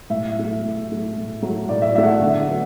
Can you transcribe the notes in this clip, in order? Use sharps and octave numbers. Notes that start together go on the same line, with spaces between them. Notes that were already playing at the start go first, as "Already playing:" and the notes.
A2 E5
F#3 A3
A2
F#3 A3
A2
F#3 A3
A2 D5
E5
F#3 A3 E5
F#5
E5
D3
F#3 B3